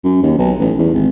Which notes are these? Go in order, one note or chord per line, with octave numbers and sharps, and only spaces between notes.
F#2
D#2
B1
A1
E2
G#1